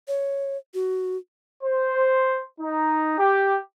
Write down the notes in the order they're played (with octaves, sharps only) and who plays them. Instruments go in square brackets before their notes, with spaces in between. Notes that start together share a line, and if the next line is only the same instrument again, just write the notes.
[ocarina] C#5
F#4
[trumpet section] C5
D#4
G4